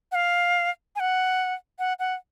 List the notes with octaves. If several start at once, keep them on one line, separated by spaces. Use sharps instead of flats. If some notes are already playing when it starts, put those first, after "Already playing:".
F#5
F5
G#5
F#5
F#5
F#5